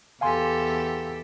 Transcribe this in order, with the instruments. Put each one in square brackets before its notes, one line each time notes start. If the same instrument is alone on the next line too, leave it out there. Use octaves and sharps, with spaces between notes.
[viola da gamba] E2 G4 A4 [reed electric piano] F5 G#5 C6